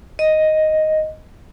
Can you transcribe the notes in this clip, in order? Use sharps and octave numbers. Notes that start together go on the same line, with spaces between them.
D#5